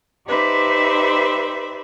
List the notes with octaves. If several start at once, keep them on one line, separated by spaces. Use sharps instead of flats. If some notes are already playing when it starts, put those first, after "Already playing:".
D#4 G4 B4 C5 D5 E5